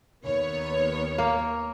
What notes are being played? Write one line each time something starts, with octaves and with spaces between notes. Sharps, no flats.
D#2 B3 C#5
A#3